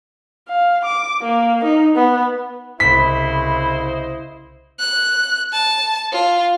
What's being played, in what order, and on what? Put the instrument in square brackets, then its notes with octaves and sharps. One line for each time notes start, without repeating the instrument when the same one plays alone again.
[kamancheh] F5
D6
A#3
D#4
B3
[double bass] C2 C#3 [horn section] E4 C5 D#5 [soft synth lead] B5 [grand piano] B6
[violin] F#6
A5
F4